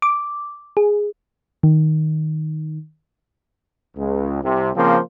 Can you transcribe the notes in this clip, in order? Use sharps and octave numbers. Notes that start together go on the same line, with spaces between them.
D6
G#4
D#3
C#2
C2 C3
C#3 F3 A#3 C4 C5